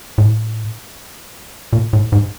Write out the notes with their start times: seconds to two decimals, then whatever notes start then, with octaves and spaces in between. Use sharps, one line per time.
0.18 A2
1.73 A#2
1.93 A2
2.12 G#2